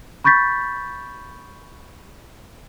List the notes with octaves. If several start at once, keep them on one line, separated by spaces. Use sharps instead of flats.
B5 C#6 G6 A6 B6